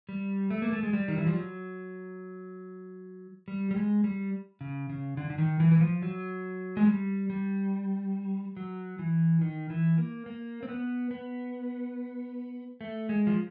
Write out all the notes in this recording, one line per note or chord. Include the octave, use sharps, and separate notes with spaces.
G3
A3
A#3
A3
G#3
G3
D#3
E3
F3
F#3
G3
G3
G#3
G3
C#3
C#3
D3
D3
D#3
E3
E3
F3
F#3
G#3
G3
G3
F#3
E3
D#3
E3
A#3
A#3
C4
B3
B3
A3
G#3
F3